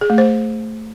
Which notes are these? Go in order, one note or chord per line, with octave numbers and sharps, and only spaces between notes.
G#4
A3
C5